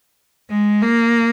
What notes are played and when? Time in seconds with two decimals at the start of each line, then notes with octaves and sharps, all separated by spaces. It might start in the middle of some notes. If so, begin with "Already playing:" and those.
0.50 G#3
0.81 A#3